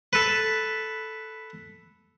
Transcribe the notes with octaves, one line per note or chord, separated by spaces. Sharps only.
A4 B4